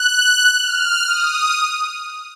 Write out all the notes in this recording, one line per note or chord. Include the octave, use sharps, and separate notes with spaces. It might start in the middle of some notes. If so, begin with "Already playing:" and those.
Already playing: F#6
F6
D#6